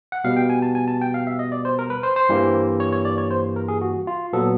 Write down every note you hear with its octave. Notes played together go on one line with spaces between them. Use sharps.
F#5
B2 G3 B3 F5
G5
G#5
A5
G#5
A5
G5
F5
E5
D#5
D5
C5
A#4
B4
C5
C5
G2 E3 G3 A#3
C#5
C#5
D5
C#5
C5
A#4
G#4
F#4
F4
A#2 F#3 B3 A4